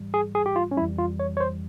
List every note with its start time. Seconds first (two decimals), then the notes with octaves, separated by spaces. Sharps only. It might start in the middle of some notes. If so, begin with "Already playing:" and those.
Already playing: G#2 E3 G3
0.14 G#4
0.35 G#4
0.46 G4
0.56 F4
0.71 C#4
0.77 F2 E3 G3 E4
0.98 F4
1.20 C#5
1.37 C#5
1.40 C5